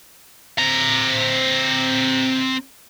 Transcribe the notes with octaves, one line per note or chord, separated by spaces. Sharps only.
C4 A#5